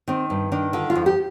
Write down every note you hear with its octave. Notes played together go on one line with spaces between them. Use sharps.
D#3 C4
G2
D#3 D4
D3 F4
F4
F2
G4